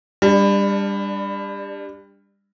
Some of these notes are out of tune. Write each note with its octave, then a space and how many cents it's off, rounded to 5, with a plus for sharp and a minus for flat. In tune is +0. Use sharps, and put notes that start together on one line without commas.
G3 +25 D4 +0